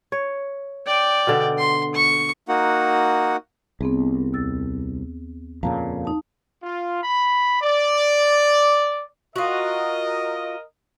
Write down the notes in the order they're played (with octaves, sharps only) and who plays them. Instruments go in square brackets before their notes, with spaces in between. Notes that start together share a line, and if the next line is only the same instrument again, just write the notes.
[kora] C#5
[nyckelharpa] D5 G5
[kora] B2 D3
[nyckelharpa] C6
C#6
[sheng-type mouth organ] A#3 D#4 F#4 F#5
[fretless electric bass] C2 [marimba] B3 C4 G#4
[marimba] D#2 E6 A6
[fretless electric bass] F2 A#2 C#3 [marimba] F5 A5 A#5
[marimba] D#4 A5
[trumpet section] F4
B5
D5
[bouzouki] F4 F#4 [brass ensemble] A#4 D#5